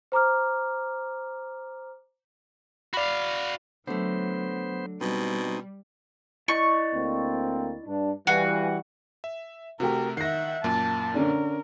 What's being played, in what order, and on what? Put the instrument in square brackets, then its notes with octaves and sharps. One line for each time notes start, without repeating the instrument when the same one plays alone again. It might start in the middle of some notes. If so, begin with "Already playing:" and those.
[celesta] C5 A#5 D6 F6
[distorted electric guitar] F#4 F5 [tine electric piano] D5 B5
[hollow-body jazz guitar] D3 A3 [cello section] F#3 [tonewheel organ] B3 C5
[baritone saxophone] B2 [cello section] G3 [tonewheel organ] C4 D#4
[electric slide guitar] E4 D5 D#5 [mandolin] C#6
[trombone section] D2 A#3 C4
G2 D4
[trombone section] E3 G3 [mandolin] F#4 [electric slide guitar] F5 G#5
[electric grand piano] E5
[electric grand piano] C3 A3 [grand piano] F#4 G4 [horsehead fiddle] A#4
[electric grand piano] D#3 [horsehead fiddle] E5 F#5 [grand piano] A#6 C7
[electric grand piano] F#2 A#2 A#3 [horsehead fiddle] A5
[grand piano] D3 C#4 D4 [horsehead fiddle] A#4